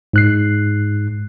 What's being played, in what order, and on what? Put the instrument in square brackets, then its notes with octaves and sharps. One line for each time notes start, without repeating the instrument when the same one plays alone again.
[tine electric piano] G#2 F#6 C7